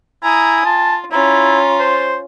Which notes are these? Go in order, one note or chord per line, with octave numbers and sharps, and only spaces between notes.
E4 G#5 A#5 D#6
F4 A5
C#4 E4 F4 A#5
C5